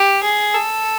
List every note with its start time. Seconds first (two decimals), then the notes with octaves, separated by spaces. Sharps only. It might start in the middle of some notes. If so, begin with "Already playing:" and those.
Already playing: G4
0.23 G#4
0.54 A4